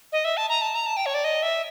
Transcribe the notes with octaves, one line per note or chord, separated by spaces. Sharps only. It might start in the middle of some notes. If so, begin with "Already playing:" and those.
D#5
E5
A5
A#5
A5
A#5
A5
G5
C#5
D5
D#5
E5